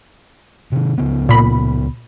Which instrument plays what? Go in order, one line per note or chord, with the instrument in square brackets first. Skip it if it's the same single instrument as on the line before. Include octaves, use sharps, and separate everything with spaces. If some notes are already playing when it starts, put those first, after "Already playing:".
[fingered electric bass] C3 D#3
C#2 C#3 B3
[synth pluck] A#2 B5